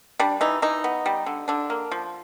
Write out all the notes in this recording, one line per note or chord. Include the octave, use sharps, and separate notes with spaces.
G3 D4
E3 D#4
E3 D#4
B3
G3
D3
D3 D4
A#3
F3